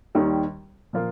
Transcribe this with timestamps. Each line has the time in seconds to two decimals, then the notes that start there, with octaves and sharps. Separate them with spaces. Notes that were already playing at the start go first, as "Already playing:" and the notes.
0.15 D#2 D#3 G3
0.93 A#2 F3 A#3 F4